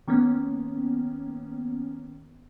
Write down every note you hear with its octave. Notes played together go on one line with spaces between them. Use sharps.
D#3 A#3 B3 C#4